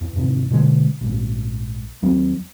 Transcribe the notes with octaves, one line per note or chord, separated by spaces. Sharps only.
E2
E2 G#2 C3
B2 D3 F#3 G#3
A#1 G#2
D#2 F#3 C4